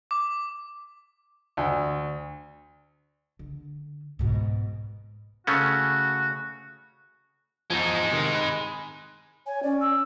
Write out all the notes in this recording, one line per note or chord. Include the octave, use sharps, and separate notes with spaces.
D6
D2
D3
G#2 B2
C#3 A3 C#4 F#4
E2 F3 G#3 D#4
C3 D#3
G#5 B5 F#6
C#5 G#5
C#4 D5
E6